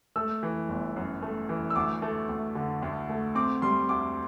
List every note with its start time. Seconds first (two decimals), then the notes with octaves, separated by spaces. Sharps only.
0.16 A3 E6
0.43 E3
0.69 G1
0.96 F#2
1.22 A3
1.49 E3
1.70 E6
1.75 D2 D6
2.02 A3
2.29 D2
2.55 D3
2.82 D2
3.09 A3
3.35 C4 D6
3.62 G3 C6
3.89 D2 D6